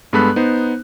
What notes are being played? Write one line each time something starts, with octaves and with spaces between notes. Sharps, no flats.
G2 G#3 B3 A4 B5 F#6
B3 D#4 C5